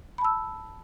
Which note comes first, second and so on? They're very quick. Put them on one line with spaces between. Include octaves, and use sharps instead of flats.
B5 A5 E6